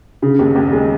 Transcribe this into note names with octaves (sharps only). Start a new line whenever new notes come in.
C#3
D#2
D#2
G#3